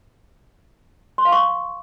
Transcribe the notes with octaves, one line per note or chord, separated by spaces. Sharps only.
C6
F5
C#6